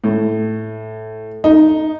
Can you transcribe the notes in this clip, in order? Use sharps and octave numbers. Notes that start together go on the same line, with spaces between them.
A2
D#4